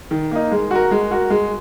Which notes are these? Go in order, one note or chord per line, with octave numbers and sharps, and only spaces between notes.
D#3
A#3 D#4
G#3
F#4 A#4
G#3
F#4 A#4
G#3